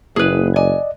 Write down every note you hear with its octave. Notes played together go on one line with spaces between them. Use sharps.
F#1 A#3 E4 G#4 B4
D5 D#5 G#5